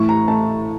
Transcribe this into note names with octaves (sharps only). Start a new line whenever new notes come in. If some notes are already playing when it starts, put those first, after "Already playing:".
Already playing: A2 E3 A3 C#6
A#5
A3 A5